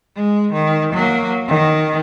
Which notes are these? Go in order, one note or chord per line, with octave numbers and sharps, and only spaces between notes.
G#3
D#3
F#3 A#3
D#3